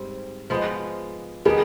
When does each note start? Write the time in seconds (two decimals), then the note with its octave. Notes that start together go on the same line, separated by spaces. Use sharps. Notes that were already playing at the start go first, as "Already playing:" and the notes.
Already playing: G#2 G3 C4
0.50 F3 G#3 B3
1.45 D#3 G3 B3 D4 G#4